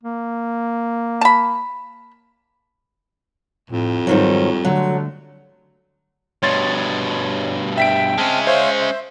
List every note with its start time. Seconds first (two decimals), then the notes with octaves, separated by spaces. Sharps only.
0.04 A#3
1.21 A5 B5
3.70 F2 A2
4.07 G#2 D#3 F#3 G3
4.64 D3 F#3 A3
6.43 G2 B2 C#5 C6 A6
7.78 E5 G5 B6 D7
8.18 G#3 C4 C#4 A5 F6
8.47 C5 C#5 E5 F5
8.81 E5